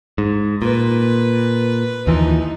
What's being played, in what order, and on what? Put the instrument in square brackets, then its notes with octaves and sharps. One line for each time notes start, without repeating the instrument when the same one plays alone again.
[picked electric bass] G#2
[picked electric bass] A#2 [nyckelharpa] B4
[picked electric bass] D#2 E3 F3 [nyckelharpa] D#4